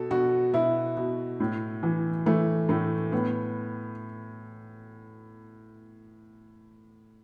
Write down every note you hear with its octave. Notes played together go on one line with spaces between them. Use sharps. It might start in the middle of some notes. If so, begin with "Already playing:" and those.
Already playing: B2 A4
B2 F#4
B2 E4
B2
A2
E3
E3 A3
A2 A3
A2 B3